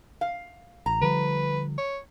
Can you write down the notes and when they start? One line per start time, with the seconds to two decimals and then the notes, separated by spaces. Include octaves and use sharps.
0.21 F5
0.86 A1 A#5
1.01 D3 F3 G3 B4
1.78 C#5